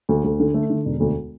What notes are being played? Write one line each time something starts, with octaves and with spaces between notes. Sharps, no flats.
D2
D2
D3
A3
D3
E1
D2